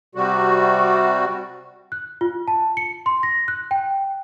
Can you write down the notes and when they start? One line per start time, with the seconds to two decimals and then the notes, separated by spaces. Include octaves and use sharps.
0.15 C3 G3 F#4
1.92 F#6
2.21 F4
2.48 A5
2.77 C#7
3.06 C6
3.23 A#6
3.48 F#6
3.71 G5